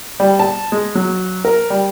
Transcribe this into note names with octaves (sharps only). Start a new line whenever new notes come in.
G3
A5
G#3
F#3
A#4
G3